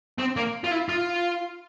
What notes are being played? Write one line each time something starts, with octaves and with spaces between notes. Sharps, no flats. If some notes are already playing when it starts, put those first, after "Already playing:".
C4
A#3
F4
E4
F4